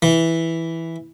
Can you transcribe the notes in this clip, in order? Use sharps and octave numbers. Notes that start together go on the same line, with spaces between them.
E3